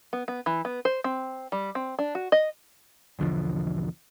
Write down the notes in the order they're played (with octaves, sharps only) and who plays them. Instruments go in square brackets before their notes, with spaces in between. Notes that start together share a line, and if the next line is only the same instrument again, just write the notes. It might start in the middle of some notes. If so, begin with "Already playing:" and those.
[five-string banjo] B3
B3
E3
B3
C5
C4
G3
C4
D4
F#4
D#5
[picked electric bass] B1 E2 D3 F3